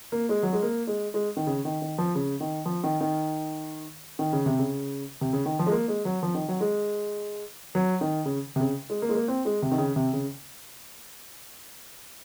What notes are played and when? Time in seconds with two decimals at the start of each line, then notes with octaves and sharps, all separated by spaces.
0.12 A#3
0.29 G#3
0.43 F#3
0.53 G#3
0.63 A#3
0.87 G#3
1.14 G#3
1.37 D#3
1.47 C#3
1.65 D#3
1.82 D#3
1.98 F3
2.15 C#3
2.40 D#3
2.66 F3
2.84 D#3
3.01 D#3
4.19 D#3
4.33 C#3
4.46 C3
4.59 C#3
5.21 C3
5.33 C#3
5.46 D#3
5.59 F3
5.66 G#3
5.72 A#3
5.88 G#3
6.05 F#3
6.23 F3
6.35 D#3
6.48 F#3
6.61 G#3
7.75 F#3
8.01 D#3
8.26 C#3
8.56 C3
8.61 C#3
8.90 G#3
9.02 A#3
9.09 G#3
9.15 A#3
9.28 C4
9.45 G#3
9.62 C3
9.72 D#3
9.78 C#3
9.96 C3
10.13 C#3